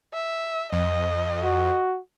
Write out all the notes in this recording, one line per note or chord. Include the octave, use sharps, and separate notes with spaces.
E5
F2 D#5
F#4